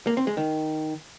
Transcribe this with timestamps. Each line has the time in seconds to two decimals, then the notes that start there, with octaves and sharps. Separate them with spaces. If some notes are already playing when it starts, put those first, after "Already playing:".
0.07 A#3
0.17 C4
0.27 G#3
0.37 D#3